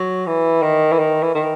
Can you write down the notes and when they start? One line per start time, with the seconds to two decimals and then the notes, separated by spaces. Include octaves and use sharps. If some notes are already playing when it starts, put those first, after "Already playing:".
Already playing: F#3
0.26 E3
0.62 D#3
0.92 E3
0.99 D#3
1.23 E3
1.35 D#3